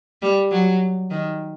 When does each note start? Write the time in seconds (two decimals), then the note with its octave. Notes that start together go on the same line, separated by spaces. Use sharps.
0.22 G3
0.51 F#3
1.10 D#3